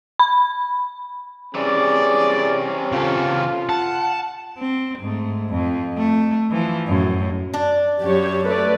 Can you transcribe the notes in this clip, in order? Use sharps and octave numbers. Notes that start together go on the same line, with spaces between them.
B5
C3 E3 C#4 G#4 D5
C#3 F4 A4
F#5 A5
C4
G#2 A3
F2
A3
E3 F3
F#2 A2
D4
F#2 G4 C#5
A3 B4 D5